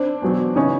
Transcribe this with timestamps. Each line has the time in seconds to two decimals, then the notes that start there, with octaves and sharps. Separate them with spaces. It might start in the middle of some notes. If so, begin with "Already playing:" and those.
Already playing: C4 D4
0.22 E2 B2 F#3
0.55 C#3 E3 C#4 D#4